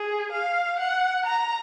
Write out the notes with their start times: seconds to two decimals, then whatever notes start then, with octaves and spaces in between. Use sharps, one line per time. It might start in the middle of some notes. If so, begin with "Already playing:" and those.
Already playing: G#4
0.32 F5
0.79 F#5
1.25 A#5